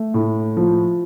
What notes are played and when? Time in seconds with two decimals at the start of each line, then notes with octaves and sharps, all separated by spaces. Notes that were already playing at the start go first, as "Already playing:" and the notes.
Already playing: A3
0.14 A2
0.57 F3